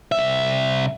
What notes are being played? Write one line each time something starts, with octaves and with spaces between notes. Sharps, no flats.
C2 E5